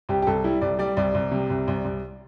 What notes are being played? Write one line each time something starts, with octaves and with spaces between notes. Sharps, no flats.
C2 G4
G4
C2 A4
G3 E4
C2 D5
G3 D5
C2 D5
C2
C3
C2
C2
C2